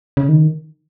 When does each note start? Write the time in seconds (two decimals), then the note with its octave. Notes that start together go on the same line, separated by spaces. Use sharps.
0.17 C#3
0.29 D#3